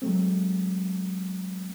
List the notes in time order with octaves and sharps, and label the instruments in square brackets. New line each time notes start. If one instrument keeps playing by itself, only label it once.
[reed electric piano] F#3 G#3 A3 C4